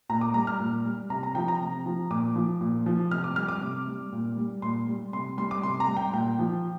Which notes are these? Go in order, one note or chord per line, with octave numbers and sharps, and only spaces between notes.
A#2 A#5
D6
G3 A#5
F6
A#2
G3
C3 A#5
A#5
F3 G5
A#5
C3
F3
A#2 D6
F3
A#2
F3
C3 F6
D6
G3 F6
D6
C3
G3
A#2
G3
A#2 C6
G3
C3 C6
G3 C6
D6
C3 C6
A#5
G3
G5
A#2 G5
F3